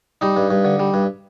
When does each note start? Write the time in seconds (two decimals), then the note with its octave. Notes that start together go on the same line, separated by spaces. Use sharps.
0.21 G3 D#4
0.37 G2
0.50 G2
0.65 D3
0.79 G3
0.94 G2